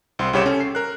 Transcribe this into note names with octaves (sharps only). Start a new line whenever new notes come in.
C2 C4 C6
C2 C#3 G4 C#5 C6 E7
C#4 A4
C7
A#4 F#6